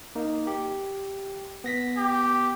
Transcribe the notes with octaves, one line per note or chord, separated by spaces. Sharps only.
A#3 D#4
G4
B3 A#6 B6
G4